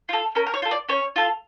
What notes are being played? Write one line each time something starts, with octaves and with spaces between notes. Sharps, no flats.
F4 A4
C#4 A#4
A#4
C#5
F4 A4
D5
C#4 C#5
F4 A4